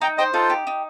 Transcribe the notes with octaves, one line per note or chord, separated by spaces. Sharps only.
D#4 G5 A#5
C5 D#5 G5
D#4 F4 A4
G4
D#4